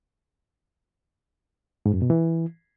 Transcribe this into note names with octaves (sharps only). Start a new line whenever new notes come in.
G#2
F#2
B2
E3